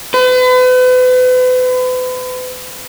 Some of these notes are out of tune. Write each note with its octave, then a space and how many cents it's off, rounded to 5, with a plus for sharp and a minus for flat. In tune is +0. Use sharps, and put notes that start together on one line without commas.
B4 +40